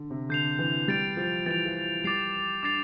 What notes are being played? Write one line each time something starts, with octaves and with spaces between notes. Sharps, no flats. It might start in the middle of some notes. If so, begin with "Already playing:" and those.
Already playing: D3
C3
D3 G6 C7 F7
E3
G3 A6 D7 F7
F3
E3 A6 D7 F7
F3
G3 D6 A6 C7 F7
D4 D6 A6 C7 F7